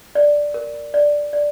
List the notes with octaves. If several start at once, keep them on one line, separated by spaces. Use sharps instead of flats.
D5
A#4
D5
D5